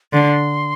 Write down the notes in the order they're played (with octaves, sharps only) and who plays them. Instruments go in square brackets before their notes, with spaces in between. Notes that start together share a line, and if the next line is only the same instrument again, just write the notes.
[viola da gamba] D3 [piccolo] C6